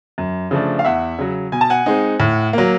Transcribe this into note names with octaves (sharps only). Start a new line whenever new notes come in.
F#2
C#3 F3 A3 D4
F5
E2 E5 F#5
C#3 F#3
B2 G#5
A5
F#5 G#5
G#3 C4 D#4
A2
F#3 A#3